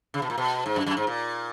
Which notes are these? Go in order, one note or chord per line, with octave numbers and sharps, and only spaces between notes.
C#3
B2
A#2
B2
G#2
F#2
F#2
G#2
A#2